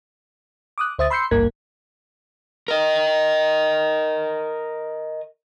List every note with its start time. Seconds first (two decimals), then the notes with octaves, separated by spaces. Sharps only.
0.78 D6 D#6 F#6
0.98 D2 C5 E5 D#6 A6
1.10 B5 C6 E6 G6 C7 C#7
1.31 G#1 C#2 G2 A#3 A#4 G#6
2.68 A#4 D#5